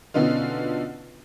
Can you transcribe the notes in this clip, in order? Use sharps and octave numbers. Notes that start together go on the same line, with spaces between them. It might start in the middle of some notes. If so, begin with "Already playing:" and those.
B2 D3 B3 C#4 D#4 F4